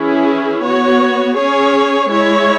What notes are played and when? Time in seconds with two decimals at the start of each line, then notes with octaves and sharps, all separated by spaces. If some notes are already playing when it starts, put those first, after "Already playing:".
Already playing: E3 C#4 E4 G#4
0.64 B3 F#4 C#5
1.37 C#4 G#4 C#5
2.11 G#3 E4 C#5